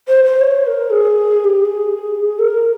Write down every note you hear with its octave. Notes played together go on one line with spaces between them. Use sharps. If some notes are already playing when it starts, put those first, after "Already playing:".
C5
C5
C#5
A#4
G#4
G#4
G4
G#4
A#4